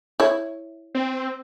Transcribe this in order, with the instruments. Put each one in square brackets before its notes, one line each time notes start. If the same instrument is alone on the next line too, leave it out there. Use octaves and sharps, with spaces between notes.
[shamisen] E4 C#5
[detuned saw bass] C4